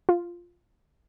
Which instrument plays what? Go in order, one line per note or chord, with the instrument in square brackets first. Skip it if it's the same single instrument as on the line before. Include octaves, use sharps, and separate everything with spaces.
[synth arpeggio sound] F4